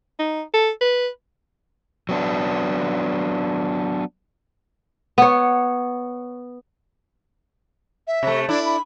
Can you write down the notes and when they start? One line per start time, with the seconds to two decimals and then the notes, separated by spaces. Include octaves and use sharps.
0.19 D#4
0.54 A4
0.81 B4
2.09 F#3 B3 D4
5.18 B3 C#5
8.07 E5
8.23 C3 A3
8.49 D4 E4 D5
8.65 B5